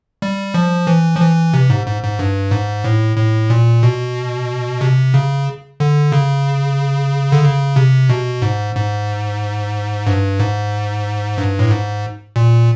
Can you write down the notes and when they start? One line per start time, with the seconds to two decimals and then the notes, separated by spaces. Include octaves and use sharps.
0.22 G3
0.54 F3
0.87 E3
1.16 F3
1.21 E3
1.54 C3
1.70 G#2
1.86 G#2
2.03 G#2
2.19 G2
2.51 G#2
2.84 A2
3.17 A2
3.50 A#2
3.83 B2
4.81 C3
5.14 C#3
5.80 D3
6.12 C#3
7.32 D3
7.44 C#3
7.76 C3
8.09 B2
8.42 G#2
8.75 G#2
10.07 G2
10.40 G#2
11.38 G2
11.59 A2
11.71 G#2
12.36 A#2